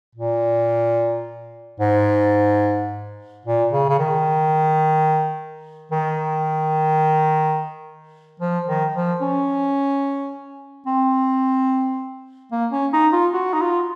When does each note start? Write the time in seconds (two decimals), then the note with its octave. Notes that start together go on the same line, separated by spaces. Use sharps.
0.15 A#2
1.80 G#2
3.45 A#2
3.72 C#3
3.89 C#3
3.99 D#3
5.91 D#3
8.40 F3
8.67 D#3
8.95 F3
9.21 C#4
10.87 C4
12.52 A#3
12.72 C#4
12.93 D#4
13.13 F4
13.34 F#4
13.53 D#4
13.61 F4